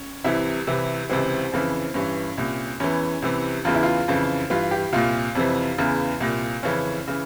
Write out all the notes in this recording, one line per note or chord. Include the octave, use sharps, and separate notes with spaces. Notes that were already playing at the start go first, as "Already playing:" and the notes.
Already playing: C#4
C2 C3 E3 E4
C2 C3 E3
C#2 C3 E3 C4
F2 C#3 E3
G2 E3 C#4
C2 A#2
E2 E3 C#4
C2 C3 E3
E2 C#3 E3 F4
E4
F4
F2 C#3 E3
G2 E3 F4
G4
C2 A#2 F4
F2 C3 E3
E2 C#3 E3
C2 A#2
F2 C#3 E3 C#4
C#3 E3